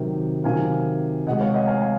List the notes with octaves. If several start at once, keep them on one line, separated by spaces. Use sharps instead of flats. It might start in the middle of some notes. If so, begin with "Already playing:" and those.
Already playing: C3 D#3 F#3
C3 D#3 F#3 F5 G#5
C3 F3 G#3 D#5 F#5
C#5 F5
D#5 F#5
F5 G#5
F5 G#5